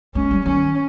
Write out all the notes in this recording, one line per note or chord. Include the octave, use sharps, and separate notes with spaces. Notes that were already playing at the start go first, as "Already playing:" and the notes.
G#3 C#4
G3
D#3 C#4